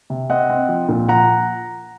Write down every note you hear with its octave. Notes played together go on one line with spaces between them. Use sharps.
C3
C4 D#5 F#5
C4
F3
A#2
F3 F#5 A#5